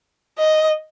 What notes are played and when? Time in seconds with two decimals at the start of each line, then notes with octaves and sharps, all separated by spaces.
0.38 D#5